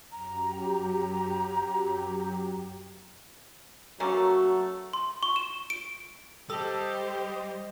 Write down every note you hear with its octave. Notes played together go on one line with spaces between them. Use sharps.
F#2 F#3 G4 A#5
F#3 A3 A#3 C#4
C6
C#6
E7
D7
G3 G4 A4 C5 D#5